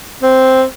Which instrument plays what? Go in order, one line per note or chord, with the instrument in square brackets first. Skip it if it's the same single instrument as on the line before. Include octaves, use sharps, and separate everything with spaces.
[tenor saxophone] C4